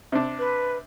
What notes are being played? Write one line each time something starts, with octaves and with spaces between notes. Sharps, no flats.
C3 D4
B4